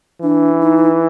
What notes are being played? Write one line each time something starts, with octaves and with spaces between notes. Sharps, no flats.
E3 D4
D#4